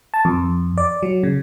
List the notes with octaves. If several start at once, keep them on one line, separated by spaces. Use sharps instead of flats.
A5
F2
D5
F#3
C#3